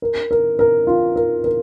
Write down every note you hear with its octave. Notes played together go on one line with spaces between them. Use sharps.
A#4
A#4
A#4
F4
A#4
A#4